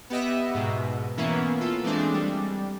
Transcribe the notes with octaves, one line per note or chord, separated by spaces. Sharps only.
B3 G4 D#5 E5
G#2 B2
E3 A#3 B3 C#4 E4
F4 A4
E3 G#3 A3 C4 D4
G3